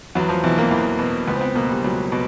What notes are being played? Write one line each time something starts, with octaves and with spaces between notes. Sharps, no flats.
E2 F#3
F3
B2 E3
A#3
E2
B2
C#2 B3
C4
B3
B2 A#3
G3
C#2 F#3
B2